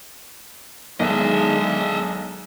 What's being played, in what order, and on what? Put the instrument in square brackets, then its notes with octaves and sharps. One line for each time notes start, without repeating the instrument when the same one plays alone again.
[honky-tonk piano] B1 [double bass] D#3 G#3 [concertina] D4 G#4 A4 [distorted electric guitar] D#5 E5